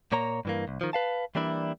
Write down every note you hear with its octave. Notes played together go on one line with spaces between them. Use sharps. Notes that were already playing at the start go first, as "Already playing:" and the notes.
A#2 A#3 C#5 A#5
G2 E3 A#3
C2
D#3 F3
B4 F5 A5
E3 G3 A#3 D4 E4